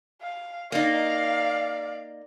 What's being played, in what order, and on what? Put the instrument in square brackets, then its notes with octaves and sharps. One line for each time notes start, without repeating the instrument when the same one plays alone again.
[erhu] F5
[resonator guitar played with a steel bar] A#3 D#4 [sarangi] D5 [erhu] F5